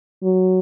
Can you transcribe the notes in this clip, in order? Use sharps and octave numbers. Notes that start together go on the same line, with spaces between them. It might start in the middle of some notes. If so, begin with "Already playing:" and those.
F#3